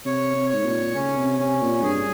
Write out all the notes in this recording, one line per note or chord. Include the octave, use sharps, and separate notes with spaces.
C3 C#5
C3
G#2 C#5
A#2
C#3 C#4
C3
C3 C#4
A#2
G2 G#4